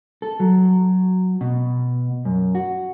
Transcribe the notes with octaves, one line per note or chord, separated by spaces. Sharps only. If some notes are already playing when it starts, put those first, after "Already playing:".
A4
F#3
B2
F#2
F#4